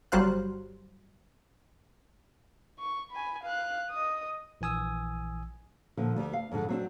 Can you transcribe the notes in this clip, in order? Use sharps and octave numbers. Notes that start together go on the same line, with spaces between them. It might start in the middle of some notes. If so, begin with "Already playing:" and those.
G1 F#3 G3 C5 F5 F#6
C#6
G#5 B5
F5 F#6
D#5 D#6
A#1 E3 G#5 D#6 E6
A#2 D3 F3
D2 G4
F5
F2 G#2 D3
F#3 C4 D4